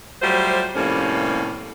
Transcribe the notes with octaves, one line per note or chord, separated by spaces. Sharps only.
F#3 G3 A3 F4 C5
A2 C3 F3 G3 A#3 C#4